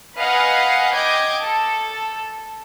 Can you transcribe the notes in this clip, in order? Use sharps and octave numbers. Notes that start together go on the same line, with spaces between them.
B4 D#5 F5 F#5 G#5
D#5 G5 D6 G#6
A4